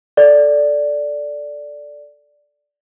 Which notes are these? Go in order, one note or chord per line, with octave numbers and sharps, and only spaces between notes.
A4 D5